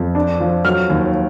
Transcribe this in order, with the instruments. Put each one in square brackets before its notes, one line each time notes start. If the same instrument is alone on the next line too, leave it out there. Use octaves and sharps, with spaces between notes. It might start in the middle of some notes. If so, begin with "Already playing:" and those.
Already playing: [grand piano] F2
D4
F3
F#3 F6
D#2